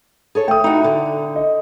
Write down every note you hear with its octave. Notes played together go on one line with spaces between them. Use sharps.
G#4 A4 C#5
A3 G5 D#6
D#4 E4 F#4
D3
D#5